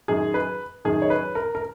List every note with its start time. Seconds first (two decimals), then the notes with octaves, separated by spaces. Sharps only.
0.08 F#2 D#3 G#4
0.34 B4
0.85 F#2 D#3 G#4
1.02 C#5
1.10 B4
1.35 A#4
1.55 A#4